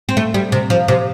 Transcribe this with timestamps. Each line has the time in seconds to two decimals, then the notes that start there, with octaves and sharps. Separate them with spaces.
0.09 C4
0.17 A3
0.34 G3
0.52 C3
0.70 F3
0.88 C3